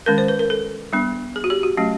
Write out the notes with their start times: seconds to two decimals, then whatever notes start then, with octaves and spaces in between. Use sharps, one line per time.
0.06 D#3 G#3 C#4 A#4
0.18 C5
0.28 B4
0.39 A#4
0.50 A4
0.93 G3 B3 D4
1.36 G#4
1.44 F#4
1.50 G4
1.63 F#4
1.77 F#3 A3 C#4